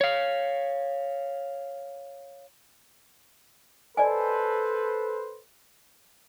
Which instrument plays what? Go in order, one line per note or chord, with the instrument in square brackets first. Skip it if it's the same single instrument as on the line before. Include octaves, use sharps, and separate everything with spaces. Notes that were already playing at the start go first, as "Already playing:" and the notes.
[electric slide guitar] C#5 F5
[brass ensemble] A4 B4 C5 [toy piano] D5 D#5 G#5